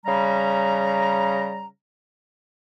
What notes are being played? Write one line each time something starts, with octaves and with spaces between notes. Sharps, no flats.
C#3 G3 A#5